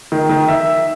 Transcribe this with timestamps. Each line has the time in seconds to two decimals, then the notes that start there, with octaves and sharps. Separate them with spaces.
0.12 D#3
0.30 D#3
0.48 E5